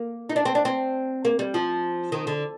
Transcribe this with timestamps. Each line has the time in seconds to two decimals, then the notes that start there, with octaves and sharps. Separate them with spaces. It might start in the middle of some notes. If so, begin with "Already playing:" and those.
Already playing: A#3
0.30 D#4
0.36 D4
0.45 C4
0.55 D4
0.65 C4
1.25 A#3
1.39 G3
1.54 F3
2.12 D#3
2.27 D3